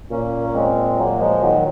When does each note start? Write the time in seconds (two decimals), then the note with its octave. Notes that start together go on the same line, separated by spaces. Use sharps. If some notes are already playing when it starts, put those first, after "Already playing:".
0.11 A#2 A#3 C#4
0.44 A#3
0.54 G#3 C4
0.97 F#3 A#3
1.19 F3 G#3
1.41 D#3 F#3